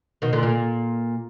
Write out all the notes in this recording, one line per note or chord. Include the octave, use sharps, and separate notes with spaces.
B2 D#3
A#2 D3
A#2